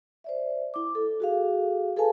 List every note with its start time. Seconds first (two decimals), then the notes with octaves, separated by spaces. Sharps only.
0.24 C5 D5 E5
0.74 E4 D6
0.95 A4
1.20 F#4 G#4 F5
1.96 G#4 A4 B4 F5 G#5 A5